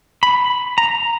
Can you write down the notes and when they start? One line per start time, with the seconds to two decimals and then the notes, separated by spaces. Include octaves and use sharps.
0.23 B5
0.78 A#5